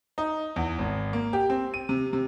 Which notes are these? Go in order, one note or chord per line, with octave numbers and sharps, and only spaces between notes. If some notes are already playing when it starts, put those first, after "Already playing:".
D#4
E2
G#1
A#3
G4
C4
D#7
C3
C3